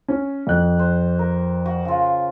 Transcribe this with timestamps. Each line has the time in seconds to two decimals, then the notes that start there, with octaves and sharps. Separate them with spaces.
0.08 C#4
0.47 F2 F#6
0.79 C5
1.19 A#4
1.66 F#4
1.85 C#3 F4